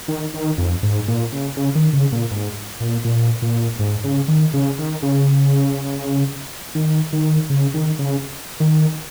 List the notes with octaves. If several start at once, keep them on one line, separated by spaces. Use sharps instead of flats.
D#3
D#3
F2
G#2
A#2
C#3
C#3
D#3
C#3
A#2
G#2
A#2
A#2
A#2
G#2
C#3
D#3
C#3
D#3
C#3
D#3
D#3
C#3
D#3
C#3
D#3